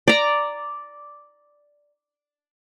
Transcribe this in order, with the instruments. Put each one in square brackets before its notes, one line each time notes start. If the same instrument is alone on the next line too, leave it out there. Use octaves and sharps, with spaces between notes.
[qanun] D5 A#5